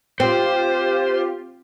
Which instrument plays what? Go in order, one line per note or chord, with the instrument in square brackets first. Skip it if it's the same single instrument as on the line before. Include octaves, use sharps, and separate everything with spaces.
[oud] C4 [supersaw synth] F4 G4 [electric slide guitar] C5